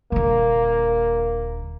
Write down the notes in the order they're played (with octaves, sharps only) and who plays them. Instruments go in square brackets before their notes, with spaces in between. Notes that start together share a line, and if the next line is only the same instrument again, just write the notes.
[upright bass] D#1 D3 [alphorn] A#3